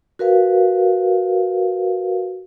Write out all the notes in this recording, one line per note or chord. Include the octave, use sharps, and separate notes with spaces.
F#4 A#4 B4 F5